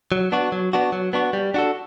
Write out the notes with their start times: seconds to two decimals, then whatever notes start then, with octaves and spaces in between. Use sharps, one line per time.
0.12 F#3
0.32 B3 D4 F#4
0.52 F#3
0.73 B3 D4 F#4
0.92 F#3
1.13 B3 D4 F#4
1.33 G3
1.54 D4 F#4 A4